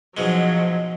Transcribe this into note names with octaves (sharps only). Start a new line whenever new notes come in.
G#2 B2 F3 F#3 G#3